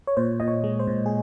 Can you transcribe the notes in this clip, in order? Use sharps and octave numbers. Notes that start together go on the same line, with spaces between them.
C#5
A#2 C5
A#2 D#5
C#5
G#3
C5
A#2
G#4